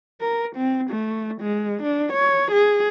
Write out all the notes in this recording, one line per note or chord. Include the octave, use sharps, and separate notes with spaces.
A#4
C4
A3
G#3
D4
C#5
G#4